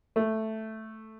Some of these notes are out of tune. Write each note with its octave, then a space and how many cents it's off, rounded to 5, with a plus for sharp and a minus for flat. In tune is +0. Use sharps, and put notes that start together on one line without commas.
A3 +0